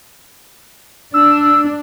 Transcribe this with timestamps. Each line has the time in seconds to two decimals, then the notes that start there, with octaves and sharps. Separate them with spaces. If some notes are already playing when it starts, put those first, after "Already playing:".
1.14 D4 E6